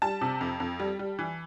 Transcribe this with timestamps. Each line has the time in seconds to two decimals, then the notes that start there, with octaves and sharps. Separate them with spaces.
0.02 G3 A5
0.21 C3
0.41 F2
0.60 F2
0.79 G3
0.99 G3
1.19 E3